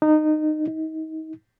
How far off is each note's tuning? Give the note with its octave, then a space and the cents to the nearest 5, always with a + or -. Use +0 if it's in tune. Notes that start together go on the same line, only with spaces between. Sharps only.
D#4 -20
D#4 +30